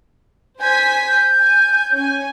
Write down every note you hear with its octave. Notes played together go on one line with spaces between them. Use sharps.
C5 G#5 G6 B6
G6
G#5
C#4 G#5